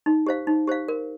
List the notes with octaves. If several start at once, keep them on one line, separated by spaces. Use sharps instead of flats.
D#4
G4 C5 F5
D#4
G4 C5 F5
A#4